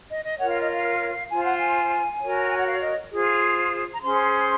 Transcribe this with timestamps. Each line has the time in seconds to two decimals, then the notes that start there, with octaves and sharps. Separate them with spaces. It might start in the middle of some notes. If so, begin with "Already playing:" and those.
0.08 D#5
0.24 D#5
0.38 F4 A#4 C#5 F#5
0.49 F5
0.60 D#5
0.71 F5
1.29 F4 C5 G#5
1.45 F#5
1.59 G#5
2.20 F#4 A#4 C#5
2.50 G#5
2.57 F#5
2.66 F5
2.81 D#5
3.11 F4 G#4 C5
3.93 A#5
4.03 C#4 G#4 C5 C6